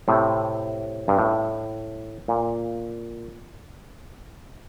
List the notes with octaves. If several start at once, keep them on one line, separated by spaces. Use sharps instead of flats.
A2 C3
G2
A2
A#2